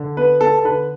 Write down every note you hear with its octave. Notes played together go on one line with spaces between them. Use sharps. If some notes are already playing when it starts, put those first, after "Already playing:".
Already playing: D3
B3 B4
B3 A4
A4
D3 B4